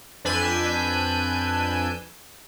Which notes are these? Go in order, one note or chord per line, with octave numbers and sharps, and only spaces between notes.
F2 D4 B4 G#5 E6 G6